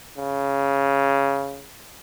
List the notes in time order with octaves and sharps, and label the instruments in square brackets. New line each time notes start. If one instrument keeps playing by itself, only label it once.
[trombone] C#3